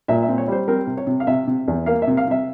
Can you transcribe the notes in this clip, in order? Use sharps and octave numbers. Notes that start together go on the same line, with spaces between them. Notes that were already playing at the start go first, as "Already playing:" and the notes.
A#2 E5
E5
C4
C#5
G3 C5
C4 A#4
C3
C#5
C3
F5
C3 E5
C3
E2
A#3 F5
E5
C3
F5
C3 E5